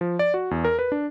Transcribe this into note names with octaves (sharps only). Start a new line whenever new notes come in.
F3
D5
F#4
E2
A#4
B4
D4